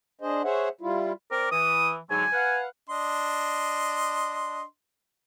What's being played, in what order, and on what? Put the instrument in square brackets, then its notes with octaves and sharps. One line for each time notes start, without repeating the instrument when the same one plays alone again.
[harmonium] D4 G#4 C5 D#5
G#4 C5 C#5 E5 F#5
G3 E4 F4
[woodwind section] C4 D5 D6 [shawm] A#4
[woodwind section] E3 [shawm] D#6
[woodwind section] G#2 D3 F#3 [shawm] G#5
[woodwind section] B4 F5 F#5
[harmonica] D4 D#5 C6